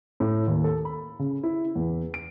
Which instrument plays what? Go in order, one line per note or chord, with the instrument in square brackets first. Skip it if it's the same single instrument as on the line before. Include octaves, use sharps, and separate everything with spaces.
[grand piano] A2
D#2
A4
B5
C#3
E4
E2
D7